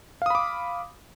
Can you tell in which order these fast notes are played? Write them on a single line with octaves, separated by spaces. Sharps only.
F5 D#6 B5 D6